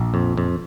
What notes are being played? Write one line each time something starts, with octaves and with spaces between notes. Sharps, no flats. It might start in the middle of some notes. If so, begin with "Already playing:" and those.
Already playing: A#1
F2
F2